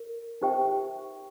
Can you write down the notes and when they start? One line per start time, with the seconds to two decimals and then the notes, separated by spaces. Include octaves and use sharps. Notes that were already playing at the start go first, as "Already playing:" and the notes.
Already playing: A#4
0.41 D#4 G4 C5 E5 G5